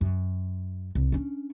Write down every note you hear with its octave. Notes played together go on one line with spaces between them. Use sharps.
F#2
C2
C#4 D4